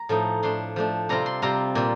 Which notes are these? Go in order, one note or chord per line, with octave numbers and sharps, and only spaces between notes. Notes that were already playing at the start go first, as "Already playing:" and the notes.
Already playing: A#5
A2 F3 A3 D#4
F3 A3 D4 C6
F3 A3 D4
C3 G3 C4 F4 A#5
C6
C3 G3 C4 F4 A#5
A#2 G3